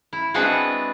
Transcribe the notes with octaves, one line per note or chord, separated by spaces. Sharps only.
E4
G#3 B3 C4 D4 F#4 B4